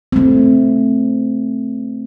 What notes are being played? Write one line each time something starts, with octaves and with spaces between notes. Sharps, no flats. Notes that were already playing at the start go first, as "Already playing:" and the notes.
A3 C4